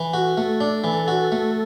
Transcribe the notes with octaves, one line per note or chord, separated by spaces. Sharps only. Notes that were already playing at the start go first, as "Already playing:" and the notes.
Already playing: E3
F#4 A4
A3 A4
D4
E3
F#4
A3